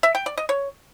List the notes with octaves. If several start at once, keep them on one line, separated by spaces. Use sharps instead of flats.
E5
G5
D5
D#5
C#5